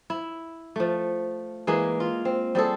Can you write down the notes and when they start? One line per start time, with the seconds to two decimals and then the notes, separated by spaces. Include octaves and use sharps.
0.10 E4
0.76 F3 A3
1.67 E3 G#3 A#3 G#4
2.00 F4
2.25 C4
2.55 G3 C4 G#4 A4